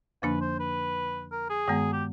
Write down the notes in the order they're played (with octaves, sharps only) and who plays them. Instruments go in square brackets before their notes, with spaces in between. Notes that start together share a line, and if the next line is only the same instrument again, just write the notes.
[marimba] F2 D3 F3 A#3 D4 [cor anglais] B4
[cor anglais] C5
B4
A#4
G#4
[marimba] G2 D#3 G#3 B3
[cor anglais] G4